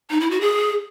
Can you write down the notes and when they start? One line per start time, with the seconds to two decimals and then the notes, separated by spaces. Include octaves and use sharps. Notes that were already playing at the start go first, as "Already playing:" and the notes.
0.10 D#4
0.20 E4
0.31 F#4
0.41 G#4